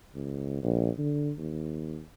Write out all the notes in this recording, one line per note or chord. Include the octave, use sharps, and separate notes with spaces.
C#2
A#1
D3
D#2